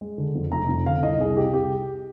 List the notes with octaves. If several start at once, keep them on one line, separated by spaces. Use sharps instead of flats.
G#3
D3
F2
F1 A#5
F2
D3 F5
C2 D#5
C2 G#4
C3 G4
C2 G4